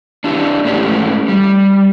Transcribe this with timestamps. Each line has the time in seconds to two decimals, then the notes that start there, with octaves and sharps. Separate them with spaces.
0.24 D4 E4 G4
0.65 G#2 A3 C#4 E4 G4
1.28 G3